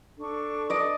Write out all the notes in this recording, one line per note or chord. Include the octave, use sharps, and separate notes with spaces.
D4 A4 C#6
D5 D#5